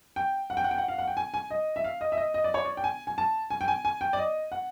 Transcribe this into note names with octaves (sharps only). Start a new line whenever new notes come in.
G5
F#5
G5
F#5
G5
F#5
F5
F#5
G5
G#5
G#5
D#5
E5
F5
D#5
E5
D#5
D#5
D5
C#5
D5
G5
G#5
G#5
A5
G#5
G5
G#5
G#5
G5
D5
D#5
F#5